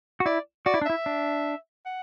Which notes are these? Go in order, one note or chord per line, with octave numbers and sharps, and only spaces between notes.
F#4
E4 D5
F#4 D5
E4
D4
E4 E5
D4
F#5